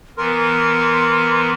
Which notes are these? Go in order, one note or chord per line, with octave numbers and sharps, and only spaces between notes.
E3 B3 A#4 C6